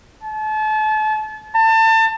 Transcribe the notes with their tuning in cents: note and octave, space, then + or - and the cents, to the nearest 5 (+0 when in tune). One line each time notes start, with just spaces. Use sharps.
A5 -35
A5 +30